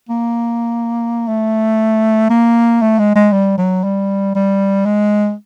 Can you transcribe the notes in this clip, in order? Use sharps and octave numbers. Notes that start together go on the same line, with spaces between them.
A#3
A3
A#3
A3
G#3
G#3
G3
F#3
G3
G3
G#3